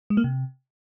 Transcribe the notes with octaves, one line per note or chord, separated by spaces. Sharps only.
G#3
A#3
C3